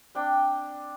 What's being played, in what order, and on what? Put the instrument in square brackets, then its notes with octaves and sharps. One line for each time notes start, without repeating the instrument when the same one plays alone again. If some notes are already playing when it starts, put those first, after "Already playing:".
[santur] C4 D4 G5